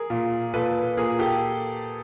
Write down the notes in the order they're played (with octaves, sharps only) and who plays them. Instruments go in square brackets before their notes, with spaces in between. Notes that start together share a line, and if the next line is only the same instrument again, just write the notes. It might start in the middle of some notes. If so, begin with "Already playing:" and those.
Already playing: [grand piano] G#4 A#4
A#2
A#2 A4 B4
A#2 G#4 A#4
G4 A4